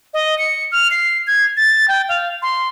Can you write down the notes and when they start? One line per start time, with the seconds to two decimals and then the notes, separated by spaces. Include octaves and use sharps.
0.14 D#5
0.39 C#7
0.72 F6
0.91 C7
1.27 G#6
1.57 A6
1.88 G5
2.09 F5
2.42 C6